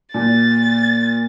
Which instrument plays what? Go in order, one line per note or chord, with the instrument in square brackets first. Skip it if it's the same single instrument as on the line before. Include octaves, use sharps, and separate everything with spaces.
[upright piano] A#2 [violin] A6